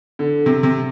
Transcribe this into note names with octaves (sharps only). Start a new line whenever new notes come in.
D3
C3
C3